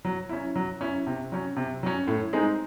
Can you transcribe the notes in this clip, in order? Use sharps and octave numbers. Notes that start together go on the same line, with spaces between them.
F#3
C#4 E4
F#3
C#4 E4
C3
F#3 C#4
C3
F#3 C#4
A2
G#3 C4 D#4